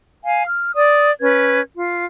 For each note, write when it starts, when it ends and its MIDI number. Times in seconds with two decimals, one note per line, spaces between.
0.24 0.42 77
0.24 0.42 80
0.47 0.75 89
0.76 1.11 74
0.76 1.11 87
1.21 1.61 61
1.21 1.61 71
1.21 1.61 92
1.76 2.04 65